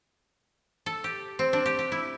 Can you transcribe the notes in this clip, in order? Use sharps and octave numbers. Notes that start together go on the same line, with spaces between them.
A4
G4
C4
D4
G4
G4
E4